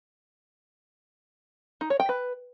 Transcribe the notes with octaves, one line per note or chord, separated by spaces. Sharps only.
D#4
C#5
G5
B4